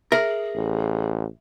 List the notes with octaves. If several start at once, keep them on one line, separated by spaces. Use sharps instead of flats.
G#4 A#4 E5
A1